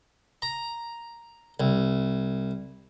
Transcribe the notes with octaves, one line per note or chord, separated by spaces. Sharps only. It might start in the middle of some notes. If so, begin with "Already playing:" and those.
A#5
C2